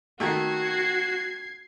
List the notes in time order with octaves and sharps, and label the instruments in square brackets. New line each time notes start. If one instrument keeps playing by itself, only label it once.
[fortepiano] D#3 A3 [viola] F#4 [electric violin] G#6 C7